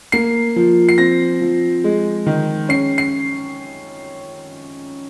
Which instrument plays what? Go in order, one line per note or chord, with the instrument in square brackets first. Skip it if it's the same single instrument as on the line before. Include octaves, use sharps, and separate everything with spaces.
[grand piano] A#3 C7
F3
C7
C4 A#6
F3
G#3
D#3
C#4 C7
C7